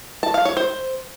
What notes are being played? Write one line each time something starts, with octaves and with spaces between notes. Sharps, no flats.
A5
F5
C#5
C5